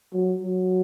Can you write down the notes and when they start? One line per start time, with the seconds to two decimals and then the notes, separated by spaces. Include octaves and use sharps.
0.13 F#3
0.43 F#3